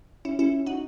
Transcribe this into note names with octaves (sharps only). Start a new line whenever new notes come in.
C#4 E4
C#4 E4
D#4 F#4